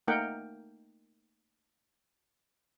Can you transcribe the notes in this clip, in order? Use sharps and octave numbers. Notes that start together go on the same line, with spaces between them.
A3 A#3 D#4 A#4 F#5 G5